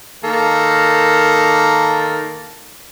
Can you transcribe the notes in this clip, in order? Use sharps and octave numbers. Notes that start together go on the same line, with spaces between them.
D#3 A#3 A4